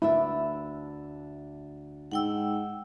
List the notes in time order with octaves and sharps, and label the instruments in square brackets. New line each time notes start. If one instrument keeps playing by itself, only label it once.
[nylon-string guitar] D2 D4 E5 [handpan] E4
[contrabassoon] G#2 [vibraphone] F#5 G5 E6